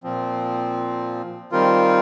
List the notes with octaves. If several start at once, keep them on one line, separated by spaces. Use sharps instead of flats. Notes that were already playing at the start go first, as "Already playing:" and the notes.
A#2 F3 C4
D#3 G3 C4 F4 A#4